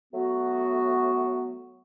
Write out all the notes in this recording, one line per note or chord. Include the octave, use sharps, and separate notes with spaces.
F#3 A3 B3 F#4